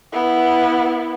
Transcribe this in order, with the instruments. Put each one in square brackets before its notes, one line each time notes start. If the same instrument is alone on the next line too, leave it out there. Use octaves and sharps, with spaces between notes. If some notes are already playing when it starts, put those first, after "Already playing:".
[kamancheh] B3 E4